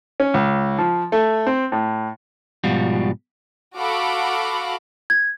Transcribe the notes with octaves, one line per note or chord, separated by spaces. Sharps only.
C#4
C#2
F3
A3
C4
A2
G#2 B2 F3 G3 F4 F#4
F#4 A4 F5 F#5 B5 D6
G#6